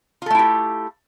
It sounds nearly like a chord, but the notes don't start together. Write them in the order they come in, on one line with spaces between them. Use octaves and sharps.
F4 A4 A3 E4 G4